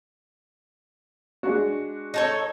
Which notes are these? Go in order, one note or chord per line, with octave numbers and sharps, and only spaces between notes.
G#3 D4 F#4
D#4 A4 C#5